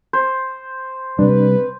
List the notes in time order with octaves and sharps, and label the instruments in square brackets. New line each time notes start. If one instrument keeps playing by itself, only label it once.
[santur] C5
[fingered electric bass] C3 G3 [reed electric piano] D4 [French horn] B4